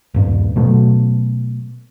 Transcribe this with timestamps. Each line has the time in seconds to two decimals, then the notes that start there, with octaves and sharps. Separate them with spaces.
0.14 D#1 G2
0.56 B2 F#3 A3